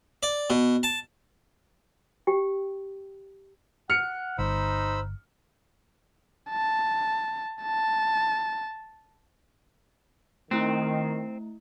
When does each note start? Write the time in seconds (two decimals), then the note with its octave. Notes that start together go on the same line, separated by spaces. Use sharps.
0.23 D5
0.50 B2
0.83 A5
2.27 G4 G5
3.90 F#5 F6 C#7
4.38 G1 D#4 C5 B5 E6
6.50 A5
7.62 A5
10.51 D#3 A3 C4 E4